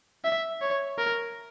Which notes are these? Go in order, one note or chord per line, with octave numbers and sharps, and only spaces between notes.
E5
C#5
A#4